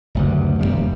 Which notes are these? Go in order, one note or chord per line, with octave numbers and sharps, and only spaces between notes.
F#1 D2 G2
D#1 C#2 G3